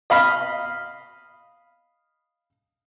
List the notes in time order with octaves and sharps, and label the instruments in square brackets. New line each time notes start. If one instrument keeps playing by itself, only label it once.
[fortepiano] D#5 F5 B5 F6